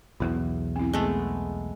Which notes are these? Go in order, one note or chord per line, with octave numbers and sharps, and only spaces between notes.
B1 E2 E4
C4 E4
G#3 A3 B3